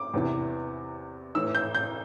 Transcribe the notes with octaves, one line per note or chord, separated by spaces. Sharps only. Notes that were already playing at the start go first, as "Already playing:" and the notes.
Already playing: D6
E2 C3 E3
A2 E3 E6
G6
G6